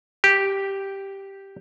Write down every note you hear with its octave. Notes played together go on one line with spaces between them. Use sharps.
G4